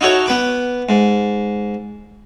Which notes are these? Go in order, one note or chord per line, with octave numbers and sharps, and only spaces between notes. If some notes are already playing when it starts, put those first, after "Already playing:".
D#4 E4 F#4 A4 C#5
B3 B4 D6
G#2